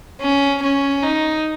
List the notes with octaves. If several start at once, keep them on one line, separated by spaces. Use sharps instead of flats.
C#4
C#4
D#4